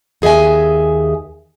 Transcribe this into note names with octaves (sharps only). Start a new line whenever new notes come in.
D#2 G#4 D#5 E5 G#5